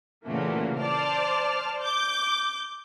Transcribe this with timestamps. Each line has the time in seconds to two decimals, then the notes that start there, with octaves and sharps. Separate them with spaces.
0.25 A#2 C#3 E3 A3 A#3 F#4
0.77 C5 D5 A5 F6
1.79 D6 G6